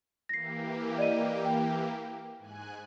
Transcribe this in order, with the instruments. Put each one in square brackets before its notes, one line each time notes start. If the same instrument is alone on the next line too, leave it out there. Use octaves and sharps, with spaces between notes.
[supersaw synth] E3 A#3 G4 [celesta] A#6 C7
[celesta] D5 D#5 D#7
G5
[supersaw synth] G#2 G#5 F#6